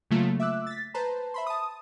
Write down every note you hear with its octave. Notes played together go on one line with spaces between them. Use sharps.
C#3 F#3 A3 A#3 F4
E5 D6 E6 F#6
A6 B6
B4 C5 A5 A#5
E5 B5 C6
A5 D#6